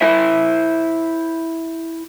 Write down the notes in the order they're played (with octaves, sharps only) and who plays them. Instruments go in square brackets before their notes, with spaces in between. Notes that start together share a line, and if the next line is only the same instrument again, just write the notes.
[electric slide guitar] E4 C5 E5